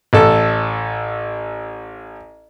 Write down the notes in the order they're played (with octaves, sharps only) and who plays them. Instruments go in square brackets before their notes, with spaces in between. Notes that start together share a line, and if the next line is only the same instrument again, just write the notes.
[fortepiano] A1 A4